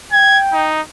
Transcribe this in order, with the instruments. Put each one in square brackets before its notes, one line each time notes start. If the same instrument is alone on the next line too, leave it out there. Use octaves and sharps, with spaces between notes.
[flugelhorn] G5 [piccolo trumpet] G#6
[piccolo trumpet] D#4